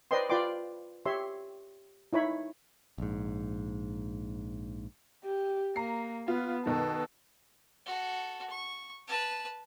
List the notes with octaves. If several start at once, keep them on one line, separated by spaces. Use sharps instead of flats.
B4 C5 D5 D#5 G5 C6
F4 B4 D5 G5 C6 D6
G4 C#5 E5 C6
D#4 E4 C#5 B5
A#1 G#2
G4
A#3 A#5 C7
B3 F4
B2 D#3 A4
F#4 A4
C#6
B4 A5